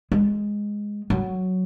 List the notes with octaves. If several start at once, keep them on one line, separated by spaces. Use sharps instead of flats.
G#3
F#3